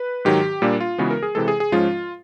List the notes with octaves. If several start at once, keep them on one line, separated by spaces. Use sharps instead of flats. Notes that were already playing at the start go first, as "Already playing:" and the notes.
Already playing: B4
G#2 D#3 F#3 G4
A#2 G3 A#3 D4
F4
C#3 E3 G#3 B3 F#4
A#4
G#4
C3 E3 G#3 A4
G#4
G#4
G#2 F3 G#3 C#4 F4